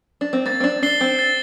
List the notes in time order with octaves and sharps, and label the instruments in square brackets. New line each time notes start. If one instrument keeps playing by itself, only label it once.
[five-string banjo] D4
C4
[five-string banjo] A#3 [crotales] A6
[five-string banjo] C4
D4
[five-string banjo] D4 [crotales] C7 G7
[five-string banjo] C4
[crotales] A6